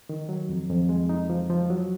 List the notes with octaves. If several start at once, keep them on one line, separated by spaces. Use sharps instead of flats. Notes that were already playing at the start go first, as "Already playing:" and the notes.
D#3
F#3
F2
F2
G#3
D#4
F3
F3
F#3